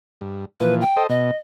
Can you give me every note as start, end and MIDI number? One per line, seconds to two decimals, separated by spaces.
0.21 0.45 43
0.60 0.84 46
0.60 0.84 52
0.60 0.84 53
0.60 0.75 71
0.81 1.03 79
0.97 1.07 69
0.97 1.07 72
0.97 1.07 75
1.09 1.31 47
1.09 1.37 75